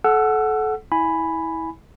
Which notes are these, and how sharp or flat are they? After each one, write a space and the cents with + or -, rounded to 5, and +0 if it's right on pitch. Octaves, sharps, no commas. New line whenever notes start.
A4 -25 F#5 +0 E6 +25
E4 -25 G#5 +0 B5 +5